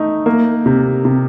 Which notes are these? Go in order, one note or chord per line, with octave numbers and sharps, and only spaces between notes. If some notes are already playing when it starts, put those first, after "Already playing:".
Already playing: A3 D#4
A#3
C3
C3